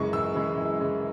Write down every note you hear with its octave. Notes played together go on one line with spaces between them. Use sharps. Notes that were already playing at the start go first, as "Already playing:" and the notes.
Already playing: F#2 C#3 E3 G#3 C#6
F#2 E6
C#3 E3 G#3
F#2
C#3 E3 G#3